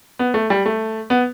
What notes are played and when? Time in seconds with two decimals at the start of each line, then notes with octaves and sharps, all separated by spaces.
0.19 B3
0.34 A3
0.50 G3
0.66 A3
1.10 B3